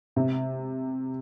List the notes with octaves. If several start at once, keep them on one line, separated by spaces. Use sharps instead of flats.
C3